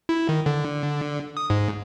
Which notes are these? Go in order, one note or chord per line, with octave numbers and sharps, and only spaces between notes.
E4
D#3
D3
D#6
G#2